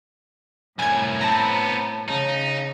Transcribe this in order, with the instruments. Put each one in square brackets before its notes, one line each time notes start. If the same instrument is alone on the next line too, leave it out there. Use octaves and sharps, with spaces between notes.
[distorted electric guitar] C2 F#2 [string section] A2 [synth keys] G#5 G#6
[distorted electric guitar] B3 C4 [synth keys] A5 A#5
[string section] C#3 [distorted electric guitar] D#4